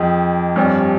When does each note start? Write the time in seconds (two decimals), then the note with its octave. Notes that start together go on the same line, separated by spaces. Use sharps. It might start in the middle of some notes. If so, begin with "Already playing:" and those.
Already playing: F2 F3 G#4 D#5 G5
0.56 G2 G3 C4 G4 C#5 G#5